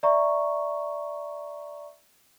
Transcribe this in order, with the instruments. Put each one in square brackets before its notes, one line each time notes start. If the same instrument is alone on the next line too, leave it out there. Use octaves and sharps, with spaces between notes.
[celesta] D5 E5 A#5 C#6